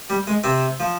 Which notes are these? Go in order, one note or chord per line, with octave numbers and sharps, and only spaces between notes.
G3
G#3
C3 C4
F3